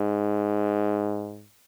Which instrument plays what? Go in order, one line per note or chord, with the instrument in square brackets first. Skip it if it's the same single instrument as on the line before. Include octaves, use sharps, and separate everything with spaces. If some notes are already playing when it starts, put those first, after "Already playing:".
Already playing: [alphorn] G#2